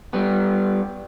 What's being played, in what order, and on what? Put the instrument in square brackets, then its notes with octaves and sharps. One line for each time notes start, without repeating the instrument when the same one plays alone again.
[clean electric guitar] G3 B3